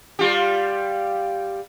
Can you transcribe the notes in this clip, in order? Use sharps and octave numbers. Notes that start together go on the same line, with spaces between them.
G3 F4 G4